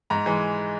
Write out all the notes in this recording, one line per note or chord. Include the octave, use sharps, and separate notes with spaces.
G#2 A#5
E3 G#3